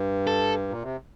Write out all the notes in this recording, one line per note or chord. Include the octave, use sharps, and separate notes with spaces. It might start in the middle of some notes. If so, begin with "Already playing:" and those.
Already playing: G2
A4
A#2
C3